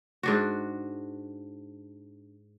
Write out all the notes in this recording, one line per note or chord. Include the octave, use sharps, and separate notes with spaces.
G#2 D4 F#4